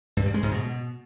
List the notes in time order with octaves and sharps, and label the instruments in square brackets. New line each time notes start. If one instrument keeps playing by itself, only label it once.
[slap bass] G2
G3
G#3
G#2
B2